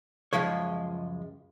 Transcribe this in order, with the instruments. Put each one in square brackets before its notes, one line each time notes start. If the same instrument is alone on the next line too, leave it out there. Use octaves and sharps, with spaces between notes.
[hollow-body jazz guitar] C#2 F#2 F3 G#3 C#5